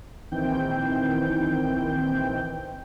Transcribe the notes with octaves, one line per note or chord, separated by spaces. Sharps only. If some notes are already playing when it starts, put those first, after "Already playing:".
A#1 D#3 E3 C4 G5 G6